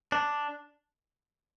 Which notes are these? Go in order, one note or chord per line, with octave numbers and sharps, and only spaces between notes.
D4